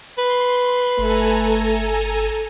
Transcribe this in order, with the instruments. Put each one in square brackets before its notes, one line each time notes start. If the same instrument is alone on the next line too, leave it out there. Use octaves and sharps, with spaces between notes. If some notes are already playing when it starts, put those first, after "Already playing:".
[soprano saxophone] B4 [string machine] C6
[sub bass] G1 [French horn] A3 [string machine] A4 G#5 A#5